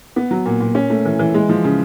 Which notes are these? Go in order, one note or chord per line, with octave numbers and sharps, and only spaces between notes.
B3
F#3
A#2
A#2
C#4
A3
E3
E3
G#3
F3
C#3